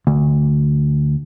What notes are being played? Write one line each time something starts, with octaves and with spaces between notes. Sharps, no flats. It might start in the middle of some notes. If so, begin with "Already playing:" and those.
D2